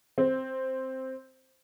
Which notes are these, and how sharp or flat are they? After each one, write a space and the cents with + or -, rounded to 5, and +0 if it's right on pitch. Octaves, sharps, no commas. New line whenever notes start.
C4 +0